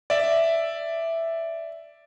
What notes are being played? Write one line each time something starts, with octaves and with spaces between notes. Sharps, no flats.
D5 E5